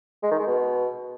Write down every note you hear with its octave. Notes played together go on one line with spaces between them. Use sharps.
G#3
D#3
G#3
B2